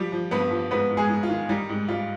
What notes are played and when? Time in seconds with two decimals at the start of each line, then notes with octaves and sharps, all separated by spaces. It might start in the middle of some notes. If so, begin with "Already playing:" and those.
Already playing: F3 G3 G4
0.12 F3
0.31 G2 B3 B4
0.51 F3
0.71 G#2 B3 B4
0.91 G#2
0.97 G#3 G#4
1.10 G#2
1.23 F4
1.30 D#3
1.49 G3 D#4
1.69 G#2
1.88 G3 F4